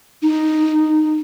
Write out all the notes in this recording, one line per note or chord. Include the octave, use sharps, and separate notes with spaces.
D#4